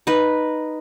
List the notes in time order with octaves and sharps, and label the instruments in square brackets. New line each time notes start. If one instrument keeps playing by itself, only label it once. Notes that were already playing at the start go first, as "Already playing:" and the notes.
[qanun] D#4 B4